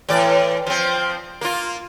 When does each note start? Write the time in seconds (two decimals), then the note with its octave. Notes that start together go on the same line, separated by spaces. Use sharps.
0.09 A2 E3 D5
0.66 F3 C4
1.41 A#3 F4